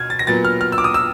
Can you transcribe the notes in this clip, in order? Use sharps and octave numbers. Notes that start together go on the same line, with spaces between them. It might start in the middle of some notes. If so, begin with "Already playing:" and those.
Already playing: B2 F6 G#6
A6
A#6
A#2 F#3 B3 A6
F6
F6
E6
D6
D#6
E6